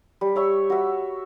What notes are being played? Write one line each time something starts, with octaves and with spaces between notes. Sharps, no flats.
G3
C#5 E5 C#6
F#4 E5